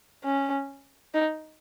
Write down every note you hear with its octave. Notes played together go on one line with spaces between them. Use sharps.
C#4
D#4